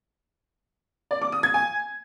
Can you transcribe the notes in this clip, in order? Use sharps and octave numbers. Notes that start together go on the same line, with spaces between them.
D5
D6
D#6
G#6
G#5